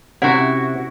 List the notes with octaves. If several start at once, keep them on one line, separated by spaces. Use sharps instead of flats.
C3 C#4 E4 F#4 F#5